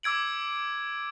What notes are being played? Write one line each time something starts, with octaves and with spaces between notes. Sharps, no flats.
D6 E6 G#6 D7 F#7